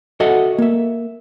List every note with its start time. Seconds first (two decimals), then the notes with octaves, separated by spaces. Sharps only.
0.20 F#4 A4 D#5 E5 F#5
0.58 A#3 E5